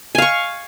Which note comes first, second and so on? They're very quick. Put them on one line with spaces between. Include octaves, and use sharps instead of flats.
G#5 F5 C#6